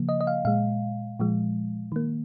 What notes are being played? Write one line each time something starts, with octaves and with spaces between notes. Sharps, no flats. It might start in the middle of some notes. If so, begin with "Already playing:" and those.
Already playing: C#3 F3 A#3
D#5
D#5
F5
A#2 G#3 F5
A#2 F3 G#3
D#3 A#3